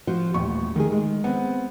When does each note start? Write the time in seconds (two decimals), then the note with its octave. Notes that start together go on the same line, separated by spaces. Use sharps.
0.07 F3 F#4 C5
0.34 D#1 A1 B3 C#6
0.76 D#3 A3 G#4
0.92 G#3
1.24 B3 C4